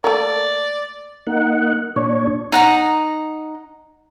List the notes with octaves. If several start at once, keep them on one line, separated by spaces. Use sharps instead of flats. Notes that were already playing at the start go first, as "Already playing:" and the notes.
A3 A#3 D5
A#3 D#4 F#5
A#2 D4 C#5
D#4 F#5 A#5